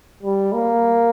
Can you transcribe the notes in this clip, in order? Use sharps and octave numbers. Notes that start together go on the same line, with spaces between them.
G3
A#3